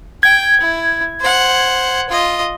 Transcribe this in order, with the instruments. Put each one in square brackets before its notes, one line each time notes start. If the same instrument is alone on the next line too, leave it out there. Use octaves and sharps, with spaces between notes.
[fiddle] G5 [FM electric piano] G#6
[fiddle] E4
C5 F#5
F4 D#5